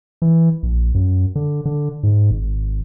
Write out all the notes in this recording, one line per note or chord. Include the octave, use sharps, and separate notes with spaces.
E3
A#1
F#2
D3
D3
G#2
G#1